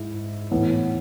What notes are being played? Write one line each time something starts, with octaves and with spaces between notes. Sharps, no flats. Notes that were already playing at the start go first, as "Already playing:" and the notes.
Already playing: G#2 G#3 E4
A2 E3 B3